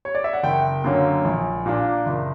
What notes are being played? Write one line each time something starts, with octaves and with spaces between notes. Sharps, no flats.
C#5
D5
E5
F#5
F#1 G5
F#2 D3 A#3 C#4
A#1
A#2 A#3 D4
F#1